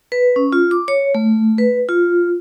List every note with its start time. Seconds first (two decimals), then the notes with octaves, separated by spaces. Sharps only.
0.12 B4
0.36 C#4
0.52 F4
0.71 D6
0.88 C#5
1.15 A3
1.58 B4
1.89 F4